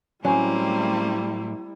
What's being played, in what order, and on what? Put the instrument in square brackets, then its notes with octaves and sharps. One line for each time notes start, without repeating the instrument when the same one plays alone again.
[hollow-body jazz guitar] A2 F#3 [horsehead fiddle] G3 E4 [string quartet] A3 A#3 C4 [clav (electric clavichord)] C#4